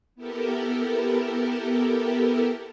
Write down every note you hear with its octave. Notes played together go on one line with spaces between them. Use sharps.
B3 E4 G4 A4 A#4